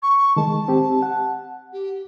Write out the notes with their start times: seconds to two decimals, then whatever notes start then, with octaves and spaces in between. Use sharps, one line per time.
0.03 C#6
0.36 D#3 G#3 A5
0.68 C4 G4
1.02 F#5
1.73 G4